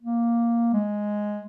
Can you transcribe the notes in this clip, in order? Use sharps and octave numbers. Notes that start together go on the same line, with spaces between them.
A#3
G#3